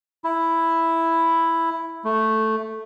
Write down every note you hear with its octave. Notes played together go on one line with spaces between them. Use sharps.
E4
A3